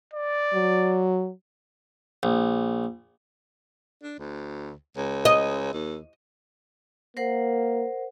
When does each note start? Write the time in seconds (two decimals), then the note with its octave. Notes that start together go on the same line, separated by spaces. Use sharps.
0.14 D5
0.54 F#3
2.23 A#1
4.02 D4
4.19 D2
4.97 C#2
5.25 D#5
5.73 D#2
7.17 A#3 A#4 C5 F#5